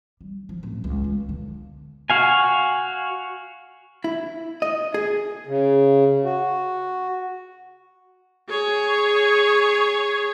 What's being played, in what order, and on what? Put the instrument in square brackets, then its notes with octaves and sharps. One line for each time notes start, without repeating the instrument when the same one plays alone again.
[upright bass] G3
F3
D1 C#4
C#2
D2 G#3
D3
[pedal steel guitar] F#4 F5 G#5
[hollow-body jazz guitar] E4
D#5
G#4
[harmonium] C#3
F#4
[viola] G#4 C#5